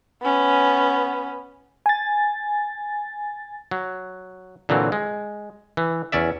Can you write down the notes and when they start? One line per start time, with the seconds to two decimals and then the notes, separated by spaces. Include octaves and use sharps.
0.22 B3 C#4
1.86 G#5 A6
3.71 F#3
4.69 A#2 D3 E3 F#3 C4
4.92 G#3
5.77 E3
6.12 E2 C#4 D5 E5